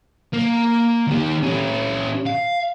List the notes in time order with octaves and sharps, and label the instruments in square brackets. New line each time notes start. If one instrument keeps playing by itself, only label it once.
[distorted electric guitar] A#3
D#3 G4
C#4 G4
F5